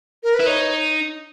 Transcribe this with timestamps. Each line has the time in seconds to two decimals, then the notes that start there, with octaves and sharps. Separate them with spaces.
0.23 A#4
0.34 B4
0.40 E4
0.47 D#4 C#5